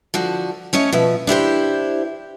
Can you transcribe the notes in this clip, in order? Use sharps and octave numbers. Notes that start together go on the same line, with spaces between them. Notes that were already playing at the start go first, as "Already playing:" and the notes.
D3 F3 F#4
A3 C#4 C#5 D#5
B2 F3 E5
D4 E4 G4 C5